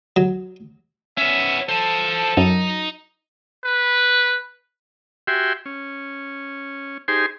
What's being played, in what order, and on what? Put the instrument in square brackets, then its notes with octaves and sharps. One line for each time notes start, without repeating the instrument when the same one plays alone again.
[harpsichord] F#3
[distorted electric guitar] B3 C#4 [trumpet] E5
[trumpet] A4 [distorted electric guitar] C5 A5
[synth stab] F#2 [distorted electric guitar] D#4
[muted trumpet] B4
[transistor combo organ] F#4 G4 E5 G5 G#5 C6
C#4
D#4 G4 G#4 C5 G#5 C6